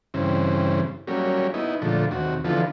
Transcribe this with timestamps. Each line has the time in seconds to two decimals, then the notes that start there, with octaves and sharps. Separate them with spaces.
0.14 G2 C#3 E3 C4
1.07 F#3 G3 A#3 C#4
1.54 B3 D#4 E4
1.82 A#2 D3 F3 A3
2.11 D#2 C3 F#4
2.44 D3 E3 F3 B3 F4 A4